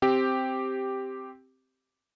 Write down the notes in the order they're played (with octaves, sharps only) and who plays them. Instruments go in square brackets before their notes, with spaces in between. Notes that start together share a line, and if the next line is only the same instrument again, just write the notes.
[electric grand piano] C4 G4